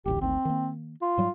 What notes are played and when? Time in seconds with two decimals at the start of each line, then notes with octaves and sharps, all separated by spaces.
0.06 D#1 A1 D2 G4
0.21 A1 D#2 C4
0.45 D#3 A#3
1.02 F4
1.18 G#2 F#3 G3